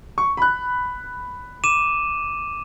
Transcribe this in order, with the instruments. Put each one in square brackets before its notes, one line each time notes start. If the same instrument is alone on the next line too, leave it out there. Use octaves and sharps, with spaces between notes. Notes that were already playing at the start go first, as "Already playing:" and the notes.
[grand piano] C#6
B5 F#6
[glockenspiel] D6 D#7 E7